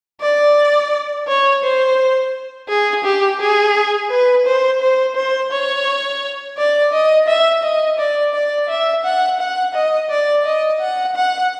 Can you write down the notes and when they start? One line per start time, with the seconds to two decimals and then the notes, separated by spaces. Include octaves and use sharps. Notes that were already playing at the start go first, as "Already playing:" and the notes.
0.22 D5
1.28 C#5
1.64 C5
2.69 G#4
3.05 G4
3.40 G#4
4.11 B4
4.46 C5
4.81 C5
5.16 C5
5.52 C#5
6.58 D5
6.93 D#5
7.28 E5
7.64 D#5
7.99 D5
8.34 D5
8.69 E5
9.05 F#5
9.40 F#5
9.75 D#5
10.10 D5
10.46 D#5
10.81 F#5
11.16 F#5